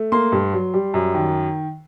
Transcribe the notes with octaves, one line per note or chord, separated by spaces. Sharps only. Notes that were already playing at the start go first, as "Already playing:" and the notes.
Already playing: A3
A#3 C6
G2
F#3
G3
F#2
D#3